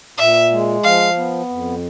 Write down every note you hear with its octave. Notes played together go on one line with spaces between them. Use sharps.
A#2 E5
G#3
F3 F5
B3
F2